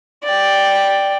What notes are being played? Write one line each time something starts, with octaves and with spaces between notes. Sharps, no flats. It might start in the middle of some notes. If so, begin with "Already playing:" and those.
D5 G5